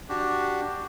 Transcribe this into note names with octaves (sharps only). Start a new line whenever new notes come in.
D4 F#4 G4